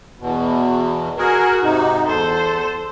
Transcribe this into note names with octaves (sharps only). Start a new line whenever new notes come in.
E2 B2
F#4 G#4 A#4
G#2 C3 D#4
E2 A4 C5